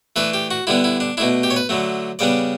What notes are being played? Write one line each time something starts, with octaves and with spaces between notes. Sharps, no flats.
E3 A3 D4 B4
G4
F#4
D3 G3 B3 D4 E4
E4
D4
B2 A3 D4 E4
G4
C#5
B4
D3 F#3 A3
C#3 G3 B3 D4 D5